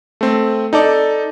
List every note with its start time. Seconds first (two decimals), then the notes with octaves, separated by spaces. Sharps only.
0.21 A3 C4
0.73 D#4 A4 D5